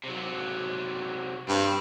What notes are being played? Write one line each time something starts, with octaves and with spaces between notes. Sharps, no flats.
C3 F#3
G2 C4